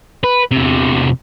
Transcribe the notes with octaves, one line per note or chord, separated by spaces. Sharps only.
B4
E2 C3